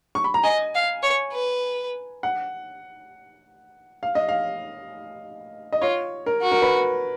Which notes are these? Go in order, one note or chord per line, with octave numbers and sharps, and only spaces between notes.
C#6
B5
A#5
D#5 G#5
F5
C#5
B4
F#5
F5
D#5
F5
D#5
F4 C#5
A#4
F#4
A#4
B4